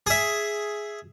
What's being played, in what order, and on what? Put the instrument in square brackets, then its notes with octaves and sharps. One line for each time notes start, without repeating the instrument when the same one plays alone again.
[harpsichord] G#4 E5